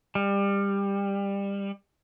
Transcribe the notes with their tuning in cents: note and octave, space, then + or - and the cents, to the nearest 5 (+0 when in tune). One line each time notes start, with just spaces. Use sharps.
G3 +25